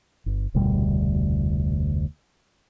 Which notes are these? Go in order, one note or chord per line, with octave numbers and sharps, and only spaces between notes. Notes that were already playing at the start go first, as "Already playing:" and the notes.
G1
F1 D2 B2 G3